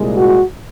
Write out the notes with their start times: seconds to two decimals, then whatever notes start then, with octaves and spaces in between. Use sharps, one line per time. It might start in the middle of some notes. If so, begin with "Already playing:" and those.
Already playing: C2 A#2 G#3
0.17 F#4